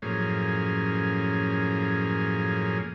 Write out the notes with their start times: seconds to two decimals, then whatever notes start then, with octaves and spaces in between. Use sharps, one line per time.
0.02 F#2 A2 F3 A#3 C#4 G#4